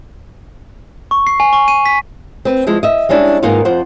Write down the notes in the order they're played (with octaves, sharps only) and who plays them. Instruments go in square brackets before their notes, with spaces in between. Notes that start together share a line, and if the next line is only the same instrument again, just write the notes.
[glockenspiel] C#6
C7
G#5
C#6
D#7
B6
[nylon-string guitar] C4 B4
F3 G#3 E4
D#5 E5
G3 G#3 C#4 D4 E4
G#2 D#3 A#3 B3 D#4 F4
F2 F3 C5 F#5